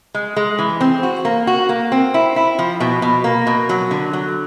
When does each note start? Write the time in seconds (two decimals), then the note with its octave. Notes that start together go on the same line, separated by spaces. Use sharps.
0.14 G#3
0.36 G#3
0.59 E3
0.81 C4
1.03 F#4
1.25 A#3
1.47 F#4
1.69 A#3
1.92 C4
2.14 E4
2.36 E4
2.59 F3
2.80 B2
3.02 B2
3.24 A#3
3.47 B2
3.69 F#3
3.91 D3
4.13 F#3